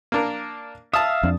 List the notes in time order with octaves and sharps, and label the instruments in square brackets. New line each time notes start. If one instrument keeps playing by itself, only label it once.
[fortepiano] A#3 D4 A#4
[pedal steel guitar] E5 F5 [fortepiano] A5 D#6
[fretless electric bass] F2 D4